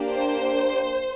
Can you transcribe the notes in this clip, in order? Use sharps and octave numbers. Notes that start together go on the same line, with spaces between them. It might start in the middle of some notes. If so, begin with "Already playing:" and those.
Already playing: A#3 D4 G4
C5